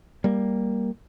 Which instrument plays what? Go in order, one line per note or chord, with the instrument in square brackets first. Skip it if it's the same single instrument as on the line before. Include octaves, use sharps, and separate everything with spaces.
[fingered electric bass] G3 A#3